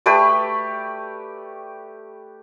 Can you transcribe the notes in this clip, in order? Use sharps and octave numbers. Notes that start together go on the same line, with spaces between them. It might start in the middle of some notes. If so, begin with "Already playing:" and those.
A3 G4 B4 D5